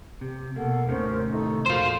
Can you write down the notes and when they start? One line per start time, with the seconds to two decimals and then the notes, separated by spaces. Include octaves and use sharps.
0.21 C3 G4
0.56 B2 A#3 A4 F#5
0.89 D#2 A2 C3 D#3 C#4 A#4 C5
1.32 D#4 A4 C#6
1.66 F2 A#2 F4 F#4 A#4 C5 G6